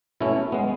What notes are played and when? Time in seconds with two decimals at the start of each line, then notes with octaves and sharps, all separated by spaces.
0.20 B2 A3 C#4 E4
0.52 G#3 B3